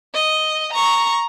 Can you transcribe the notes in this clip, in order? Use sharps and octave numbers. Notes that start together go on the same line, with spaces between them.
D#5
A#5 C#6